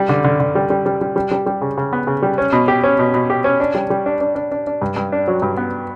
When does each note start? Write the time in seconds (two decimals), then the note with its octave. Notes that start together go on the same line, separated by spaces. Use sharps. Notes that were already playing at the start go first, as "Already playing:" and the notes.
Already playing: G3
0.09 D3
0.24 D3
0.40 D3
0.55 G3
0.70 G3
0.86 G3
1.01 G3
1.16 G3
1.31 G3
1.46 G3
1.61 C#3
1.77 C#3
1.93 B3
2.07 C#3
2.23 G3
2.38 C#4
2.52 B2
2.68 G4
2.84 C#4
2.99 B2
3.14 B2
3.30 G4
3.44 C#4
3.60 D4
3.75 G3
3.90 G3
4.06 D4
4.21 D4
4.35 D4
4.51 D4
4.67 D4
4.82 G2
4.96 G2
5.12 D4
5.28 F#3
5.42 G2
5.57 B3